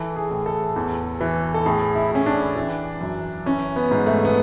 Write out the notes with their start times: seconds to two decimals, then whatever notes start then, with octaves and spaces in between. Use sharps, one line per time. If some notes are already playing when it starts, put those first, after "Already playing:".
Already playing: E3 A4
0.16 G#4
0.31 A2
0.46 A4
0.76 E2
1.21 E3
1.54 A4
1.66 A2 G#4
1.95 E4
2.11 A2 C#4
2.26 D4
2.56 E3
3.01 F#2
3.46 E3 C#4
3.76 B3
3.91 G#2
4.06 A3
4.25 B3